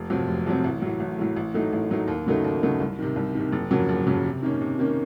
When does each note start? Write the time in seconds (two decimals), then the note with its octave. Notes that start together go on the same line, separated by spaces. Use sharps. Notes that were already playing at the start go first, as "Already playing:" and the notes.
Already playing: F1
0.10 F2 C3 F#3 C4
0.28 F1
0.47 F2 C3 F#3 C4
0.64 A1
0.82 A2 F#3
1.00 A1
1.18 A2 F#3
1.36 A1
1.54 A2 F#3 A3 D#4
1.73 A1
1.90 A2 F#3 A3 D#4
2.08 D#2
2.26 C#3 F#3 A3 D#4
2.44 D#2
2.62 C#3 F#3 A3 D#4
2.80 C2
2.99 C3 D#3
3.16 C2
3.35 C3 D#3
3.53 F#1
3.71 F2 C#3 F#3 A#3
3.89 F#1
4.07 F2 C#3 F#3 A#3
4.24 C3
4.43 D#3 A#3 C#4
4.61 C3
4.79 D#3 A#3 C#4